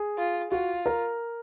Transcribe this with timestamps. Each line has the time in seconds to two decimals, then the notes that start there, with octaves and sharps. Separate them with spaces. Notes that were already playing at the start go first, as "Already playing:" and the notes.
Already playing: G#4
0.18 F4
0.51 F4 F#4
0.86 A#4